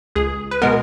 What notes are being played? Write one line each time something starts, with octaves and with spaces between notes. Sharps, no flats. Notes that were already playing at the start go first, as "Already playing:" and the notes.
C#2 G#4
B4
B2 G#3 B3 A#4